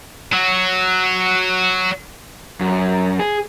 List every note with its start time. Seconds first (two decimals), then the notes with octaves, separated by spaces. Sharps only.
0.33 F#3 F#4
2.61 F#2
3.19 G#4